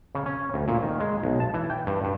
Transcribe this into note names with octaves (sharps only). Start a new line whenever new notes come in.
C#3
C#4
D2
A#2
D#3
G#3
B1
A5
E3
G5
G2
G2